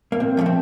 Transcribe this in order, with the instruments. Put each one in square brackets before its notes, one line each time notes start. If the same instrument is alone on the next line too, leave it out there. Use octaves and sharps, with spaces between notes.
[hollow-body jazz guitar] A#3
A#2 C4
F3 A3 A#3
C4